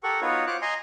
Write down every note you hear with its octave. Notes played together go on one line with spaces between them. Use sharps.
G4 A4 A#4 F#5 C#6
B3 D#4 F4 F#4 B4 C#5
F4 C5 C#5 D6 F#6
D#5 G#5 A#5 C6